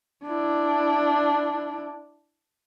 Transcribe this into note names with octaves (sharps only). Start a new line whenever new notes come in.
D4 E4